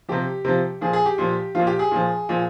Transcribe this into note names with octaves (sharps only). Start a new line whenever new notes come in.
C3 F3 G4
C3 F3
A#2 F3 G#4
G#4
G4
A#2 F3
A#2 F3 F4
G4
G#4
A#2 F3
A#2 F3